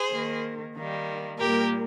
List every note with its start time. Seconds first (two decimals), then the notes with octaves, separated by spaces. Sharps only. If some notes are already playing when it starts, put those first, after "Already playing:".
Already playing: G#4 C5
0.11 D#3 A#3
0.76 D#3 G3 A#3
1.40 A#2 G3 A#3 G4 A#4